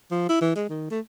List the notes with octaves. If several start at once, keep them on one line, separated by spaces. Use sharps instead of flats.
F3
E4
E3
G#3
D#3
A3